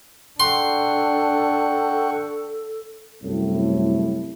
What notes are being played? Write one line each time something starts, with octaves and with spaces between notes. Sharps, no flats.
D4 A4 F#5 G5 C6 C#6
C2 F#2 A2